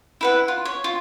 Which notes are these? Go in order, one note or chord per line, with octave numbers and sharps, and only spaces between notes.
E4 B4 F#5
F4
C#5
F4